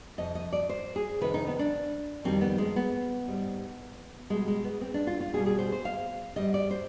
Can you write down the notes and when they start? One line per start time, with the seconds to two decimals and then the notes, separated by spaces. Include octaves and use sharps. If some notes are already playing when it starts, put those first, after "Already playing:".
0.18 F2 C3 D#5
0.35 D#5
0.53 D5
0.69 C5
0.96 G#4
1.21 F2 C3 D#3 B4
1.34 D#4
1.47 B3
1.59 D4
2.24 F2 D#3 G3 C4
2.41 B3
2.58 G#3
2.76 B3
3.28 G#2 G3
4.30 B2 G3 G#3
4.48 G#3
4.64 B3
4.81 C4
4.94 D4
5.07 F4
5.20 F4
5.33 B2 G#4
5.38 G3
5.46 G#4
5.59 C5
5.72 C5
5.85 F5
6.36 G#2 G3 D#5
6.54 D5
6.71 C5